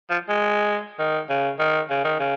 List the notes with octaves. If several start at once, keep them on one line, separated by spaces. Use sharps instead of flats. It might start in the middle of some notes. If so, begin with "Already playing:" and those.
F3
G#3
D#3
C#3
D#3
C#3
D#3
C#3